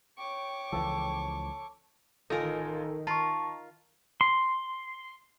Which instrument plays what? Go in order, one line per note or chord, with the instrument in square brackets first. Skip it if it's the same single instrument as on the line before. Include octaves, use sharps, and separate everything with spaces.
[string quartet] C#5 C#6 D6 [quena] G5
[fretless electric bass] C#2 E3 F3 [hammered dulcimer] A4
[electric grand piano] A1 F4 G#5 [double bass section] D#3 [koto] D#4 A#4 [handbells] A4
[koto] F4 [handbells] A5 C#6 [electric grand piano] A#5
[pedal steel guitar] C6